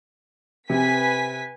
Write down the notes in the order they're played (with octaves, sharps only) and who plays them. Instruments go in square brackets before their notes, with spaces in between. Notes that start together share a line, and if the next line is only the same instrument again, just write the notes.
[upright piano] C3 [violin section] B4 G#5 B6